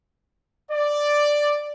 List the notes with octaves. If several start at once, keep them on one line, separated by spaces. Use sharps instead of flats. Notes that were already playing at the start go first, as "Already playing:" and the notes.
D5